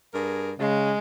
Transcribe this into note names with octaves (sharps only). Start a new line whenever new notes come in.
G2 G#4 A#4
C#3 G#3